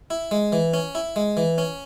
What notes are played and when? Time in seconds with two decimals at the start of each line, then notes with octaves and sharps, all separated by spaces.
0.10 E4
0.31 G#3
0.52 E3
0.74 C#4
0.95 E4
1.16 G#3
1.37 E3
1.58 C#4